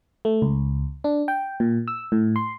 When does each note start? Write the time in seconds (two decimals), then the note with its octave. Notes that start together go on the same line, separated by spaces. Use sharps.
0.25 A3
0.42 C#2
1.04 D4
1.28 G5
1.60 A#2
1.88 E6
2.12 A2
2.36 C6